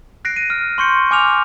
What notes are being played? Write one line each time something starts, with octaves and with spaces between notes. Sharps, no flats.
F#6 A#6 C7 D7
D#7
F6
C6 C#6 G6 C#7
G#5 D6 F6 F7